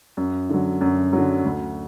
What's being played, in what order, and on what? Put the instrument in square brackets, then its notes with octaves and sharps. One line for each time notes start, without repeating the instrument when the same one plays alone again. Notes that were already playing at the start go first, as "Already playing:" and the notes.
[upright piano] F#2
D3 F#3
F#2
D3 F#3
D2